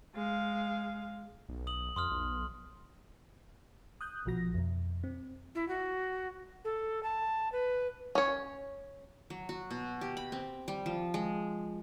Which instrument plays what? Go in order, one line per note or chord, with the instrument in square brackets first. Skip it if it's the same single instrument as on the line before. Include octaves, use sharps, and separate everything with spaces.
[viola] G#3 F5
[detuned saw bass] B1
[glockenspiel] D#6 F#7
[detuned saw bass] F2 [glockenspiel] C6 D#6 F6
[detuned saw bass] B1
[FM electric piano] D#6 F#6 G6
A#1 B2 F3 F#4 A#6
F2 B2
C4
[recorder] E4
F#4
A4
A5
B4
[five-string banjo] C#4 C#5
[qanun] F#3
F#4
B2
G4
B5
C4
G3
F3
G#3